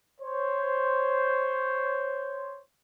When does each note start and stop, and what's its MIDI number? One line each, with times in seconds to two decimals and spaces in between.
0.21 2.60 72
0.21 2.60 73